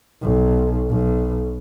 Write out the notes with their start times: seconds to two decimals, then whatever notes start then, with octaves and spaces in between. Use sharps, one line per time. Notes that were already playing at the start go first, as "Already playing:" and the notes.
0.23 B1
0.90 B1